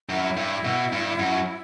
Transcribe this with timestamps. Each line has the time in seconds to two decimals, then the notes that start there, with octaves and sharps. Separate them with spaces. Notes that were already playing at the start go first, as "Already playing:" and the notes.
0.09 F#2 E4
0.37 G2
0.65 B2
0.92 G2
1.19 F#2